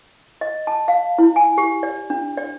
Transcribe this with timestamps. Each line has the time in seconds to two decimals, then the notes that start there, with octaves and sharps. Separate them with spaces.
0.41 D#5
0.67 A5
0.88 F5
1.18 E4
1.36 G#5
1.58 G4
1.83 D5
2.10 D4
2.38 D5